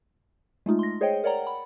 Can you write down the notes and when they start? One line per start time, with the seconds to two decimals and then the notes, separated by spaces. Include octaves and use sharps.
0.66 G#3 A3 D#4 F4
0.79 C6 A#6
1.01 G#4 C5 C#5 D#5 G5
1.24 A#4 C#5 D5 F#5 G5 A#5
1.47 B5